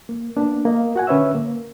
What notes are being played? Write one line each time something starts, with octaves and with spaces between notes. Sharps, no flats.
A#3
A#3 B3 D4
A#3 D#5
F#4 F#5 G#5
D3 C#4 B4 C#5 E5 E6
A#3